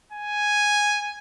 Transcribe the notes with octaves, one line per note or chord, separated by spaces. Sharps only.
G#5